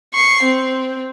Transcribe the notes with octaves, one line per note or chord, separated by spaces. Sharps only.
C#6 C7
C4